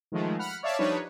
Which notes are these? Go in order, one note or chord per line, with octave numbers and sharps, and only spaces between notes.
D#3 F3 G#3 A3
F#5 B5 F6
C#5 D5 E5 F5 A5
F3 G3 D4 D#4 B4 C#5